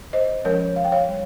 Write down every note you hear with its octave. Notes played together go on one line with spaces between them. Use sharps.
C5 D#5
F3 G#3 C#4 A#4 C#5
F5
G5
C#5 F5
G3